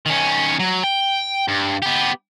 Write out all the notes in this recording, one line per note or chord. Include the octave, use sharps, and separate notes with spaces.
D#3 C#4
F#3
G5
G2
B3 G4